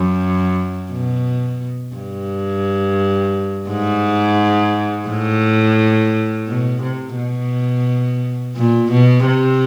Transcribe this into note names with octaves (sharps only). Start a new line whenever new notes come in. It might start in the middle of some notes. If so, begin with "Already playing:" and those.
Already playing: F#2
B2
G2
G#2
A2
B2
C3
B2
A#2
B2
C3